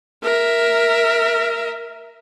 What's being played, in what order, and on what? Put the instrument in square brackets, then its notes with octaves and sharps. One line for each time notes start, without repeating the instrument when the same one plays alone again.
[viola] A#4 E5